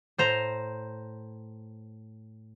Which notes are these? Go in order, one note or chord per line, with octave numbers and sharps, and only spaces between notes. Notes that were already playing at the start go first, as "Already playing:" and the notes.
A2 C5 A#5